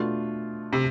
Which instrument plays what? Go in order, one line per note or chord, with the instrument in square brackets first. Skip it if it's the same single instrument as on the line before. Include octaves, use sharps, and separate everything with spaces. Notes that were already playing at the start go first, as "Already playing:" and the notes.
Already playing: [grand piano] B2 A3 D4 F4
[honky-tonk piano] C3